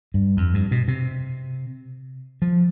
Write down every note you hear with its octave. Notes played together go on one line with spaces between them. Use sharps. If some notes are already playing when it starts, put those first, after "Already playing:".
G2
F2
G2
B2
C3
F3